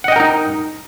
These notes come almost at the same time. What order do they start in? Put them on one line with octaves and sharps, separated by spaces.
F#5 D#5 G5 A#4 D#4